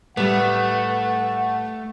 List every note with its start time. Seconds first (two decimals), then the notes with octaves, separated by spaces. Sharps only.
0.17 A2 G3 A3 B3 F#5